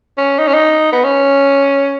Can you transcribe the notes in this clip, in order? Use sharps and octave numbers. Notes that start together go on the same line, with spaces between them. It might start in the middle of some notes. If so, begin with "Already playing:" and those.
C#4
D#4
C#4
D#4
B3
C#4